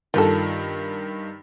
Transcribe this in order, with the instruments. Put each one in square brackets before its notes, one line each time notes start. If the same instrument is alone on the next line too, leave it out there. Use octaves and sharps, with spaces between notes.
[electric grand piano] G2 D#3 [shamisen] F4 A4